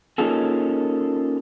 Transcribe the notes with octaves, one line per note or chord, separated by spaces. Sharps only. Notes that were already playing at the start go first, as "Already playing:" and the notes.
A#3 C#4 D#4 F4 G#4 A4